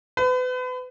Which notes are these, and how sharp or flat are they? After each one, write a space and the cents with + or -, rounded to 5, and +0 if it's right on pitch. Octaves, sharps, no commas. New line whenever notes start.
B4 +35